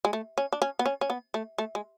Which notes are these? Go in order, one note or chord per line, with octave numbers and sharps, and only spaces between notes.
G#3
A3
C#4
D4
C#4
B3
C#4
C#4
B3
A3
A3
G#3